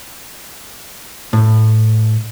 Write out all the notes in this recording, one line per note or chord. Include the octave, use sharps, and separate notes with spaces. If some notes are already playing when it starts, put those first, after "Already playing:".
A2